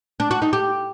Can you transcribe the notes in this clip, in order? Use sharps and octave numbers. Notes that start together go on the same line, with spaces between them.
D4
F#4
D#4
G4